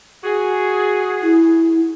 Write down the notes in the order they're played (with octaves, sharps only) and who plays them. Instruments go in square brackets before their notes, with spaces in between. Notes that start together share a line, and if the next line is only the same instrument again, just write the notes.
[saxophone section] F#4 G#4
[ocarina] E4